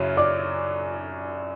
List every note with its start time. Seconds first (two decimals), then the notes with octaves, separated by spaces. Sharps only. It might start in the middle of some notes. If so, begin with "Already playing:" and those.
Already playing: F#2 C#3 F#3 C#4 E4
0.17 D5 D6